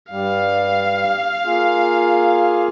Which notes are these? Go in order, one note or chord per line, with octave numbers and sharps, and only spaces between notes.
G2 G3 F5
A#3 F4 G#4